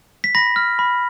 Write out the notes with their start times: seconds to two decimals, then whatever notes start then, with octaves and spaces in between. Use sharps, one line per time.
0.24 B6
0.35 B5 A#6
0.56 F6
0.79 B5